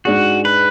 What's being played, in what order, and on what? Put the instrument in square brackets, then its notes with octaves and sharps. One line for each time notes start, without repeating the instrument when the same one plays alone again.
[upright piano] G#2 G#3 D4 G#4 [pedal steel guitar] F#4
[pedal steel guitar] B4